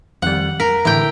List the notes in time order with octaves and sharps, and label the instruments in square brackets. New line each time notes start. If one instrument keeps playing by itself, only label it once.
[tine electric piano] F2 D#3 G3 [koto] F#5
[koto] A#4 [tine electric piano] B6
[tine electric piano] A2 D3 E3 [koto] E4 G5